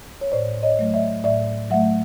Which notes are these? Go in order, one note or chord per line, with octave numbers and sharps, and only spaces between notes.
C#5
A2 C5 D5
C#5 D#5
F#3 A3
D5 E5
A2 D5 E5
F#3 A3 E5 F#5